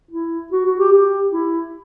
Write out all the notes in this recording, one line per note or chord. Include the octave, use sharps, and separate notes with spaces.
E4
F#4
F#4
G4
G4
E4